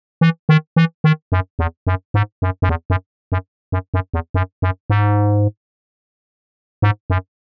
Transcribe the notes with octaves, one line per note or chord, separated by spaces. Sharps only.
E3
D#3
E3
D#3
F#2
E2
F#2
G#2
F#2
F#2
E2
F#2
F#2
F#2
F#2
E2
F#2
F#2
G#2
G#2
F#2